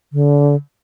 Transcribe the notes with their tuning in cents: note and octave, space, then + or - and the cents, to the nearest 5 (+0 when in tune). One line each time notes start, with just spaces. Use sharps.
D3 -25